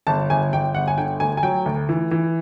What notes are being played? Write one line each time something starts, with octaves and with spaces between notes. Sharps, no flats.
G1 A5
G1 G#5
G1 G5
G1 F#5
G#5
D3 G5
D2 G#5
G#5
F#3 G5
D2
E3
E3